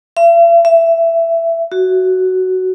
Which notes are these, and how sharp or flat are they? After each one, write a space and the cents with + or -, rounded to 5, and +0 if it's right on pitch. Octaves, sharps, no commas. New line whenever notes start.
E5 +45
E5 +15
F#4 +10